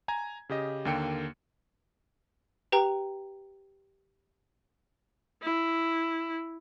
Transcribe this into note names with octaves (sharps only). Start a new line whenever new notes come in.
G#5 A#5 G#6
C#3 G4 D#5
D#2 D3 A#3 G5 C#7
G4 B4 G5 A#5
E4